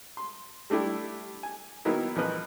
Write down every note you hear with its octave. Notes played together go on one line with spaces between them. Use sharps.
C6
G3 A3 D4 E4 G4
G#5
D#3 F#3 A#3 B3 D#4 E4
A#1 E3 F3 D#4 B4 D#5